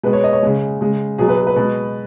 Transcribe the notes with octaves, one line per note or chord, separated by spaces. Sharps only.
B2 G#3 B4
C#5
D#5
C#5
C#3 G#3
C#3 G#3
B2 F#3 G#4
B4
G#4
B4
B2 G#3